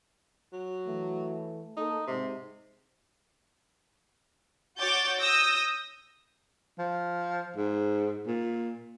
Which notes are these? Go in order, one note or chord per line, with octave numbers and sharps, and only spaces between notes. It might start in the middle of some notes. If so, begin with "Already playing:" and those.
F#3
E3 A3
A#3 D#4 A4
G#2 C3
F#4 C#5 D6 G6 A6
D#6 E6 G6 A#6
F3
G#2
A#2